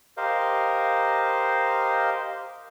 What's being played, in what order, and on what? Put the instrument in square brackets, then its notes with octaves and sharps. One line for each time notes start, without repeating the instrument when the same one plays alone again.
[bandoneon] G4 A#4 C5 D#5 F5